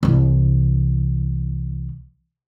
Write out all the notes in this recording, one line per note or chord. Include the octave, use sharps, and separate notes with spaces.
C2 E3